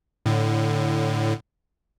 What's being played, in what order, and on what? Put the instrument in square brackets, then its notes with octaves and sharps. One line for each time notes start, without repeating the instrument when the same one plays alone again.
[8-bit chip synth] A2 D3